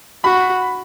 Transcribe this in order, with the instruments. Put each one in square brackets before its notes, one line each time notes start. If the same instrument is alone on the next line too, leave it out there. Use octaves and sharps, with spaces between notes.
[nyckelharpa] F#4 [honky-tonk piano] B5